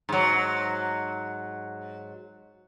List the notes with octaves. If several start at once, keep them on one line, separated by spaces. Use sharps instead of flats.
G#2 F#3